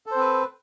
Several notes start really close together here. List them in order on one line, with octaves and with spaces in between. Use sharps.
A4 C5 C4 B4